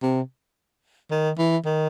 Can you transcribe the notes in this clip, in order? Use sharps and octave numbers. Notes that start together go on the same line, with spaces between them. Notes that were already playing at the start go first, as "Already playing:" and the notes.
C3
D#3
E3
D#3